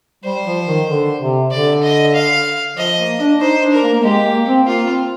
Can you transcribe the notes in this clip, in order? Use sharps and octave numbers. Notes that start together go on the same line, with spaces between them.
G3 C5
F3
D#3
D3
C3
D3 D5
D#5
F5
F3 D#5
A#3
D4
D#4 C5
D4
A#4
A#3
A#3
G#3 G4
A#3
C4
A#3 F4
C4